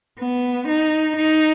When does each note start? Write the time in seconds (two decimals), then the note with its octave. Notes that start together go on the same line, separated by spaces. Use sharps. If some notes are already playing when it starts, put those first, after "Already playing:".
0.19 B3
0.68 D#4
1.16 D#4